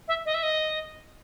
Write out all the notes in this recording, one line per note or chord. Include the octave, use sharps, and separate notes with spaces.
E5
D#5
E5
D#5